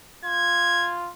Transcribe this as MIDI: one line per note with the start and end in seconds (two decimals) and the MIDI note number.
0.25 1.11 65
0.25 0.94 92